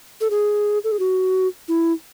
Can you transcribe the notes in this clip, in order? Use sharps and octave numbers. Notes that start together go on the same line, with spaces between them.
A4
G#4
A4
G#4
F#4
E4